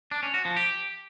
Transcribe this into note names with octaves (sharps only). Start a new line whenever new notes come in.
D4
C#4
F#4
F3
G4